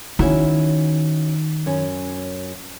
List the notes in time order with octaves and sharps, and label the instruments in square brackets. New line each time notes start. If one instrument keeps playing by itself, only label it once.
[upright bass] D#3 [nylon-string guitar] C#4 E4 F#4
[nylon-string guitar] F#2 C#4